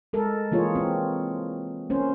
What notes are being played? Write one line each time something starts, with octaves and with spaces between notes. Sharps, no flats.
G#3 A4 A#4
E3 A#3 F4 G#4 C#5
C4
A#3 C#4 C5